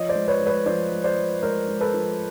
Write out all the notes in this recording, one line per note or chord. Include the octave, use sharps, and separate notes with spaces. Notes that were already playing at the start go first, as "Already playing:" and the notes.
Already playing: F3 C#5 D#5
C5 D5
G#3
B4 C#5
G#3
B4 C#5
F3 C5 D5
G#3
C5 D5
G#3
G#3 A#4 C5
G#3
A4 B4
F3